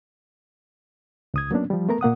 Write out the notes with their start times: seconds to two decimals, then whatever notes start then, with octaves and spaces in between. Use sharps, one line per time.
1.34 C#2 D#6 G#6
1.51 F#3 A#3 B3 C#4 D4
1.70 F3 G3
1.89 A3 B3 A#4 A#5
2.01 A#2 A#3 F#5 D#6